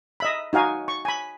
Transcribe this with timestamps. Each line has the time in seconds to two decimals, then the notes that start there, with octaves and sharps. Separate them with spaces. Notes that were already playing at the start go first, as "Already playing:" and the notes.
0.20 D#5 E5 B5
0.53 D#4 F#4 F5 G#5
0.88 C#6
1.05 G#5 B5